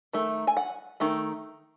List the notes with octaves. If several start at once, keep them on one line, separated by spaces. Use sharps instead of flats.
D#3 A3
G#5
F#5
D#3 A3